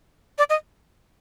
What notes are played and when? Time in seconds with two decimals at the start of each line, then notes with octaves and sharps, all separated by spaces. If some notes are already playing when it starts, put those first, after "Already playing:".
0.38 D5
0.50 D#5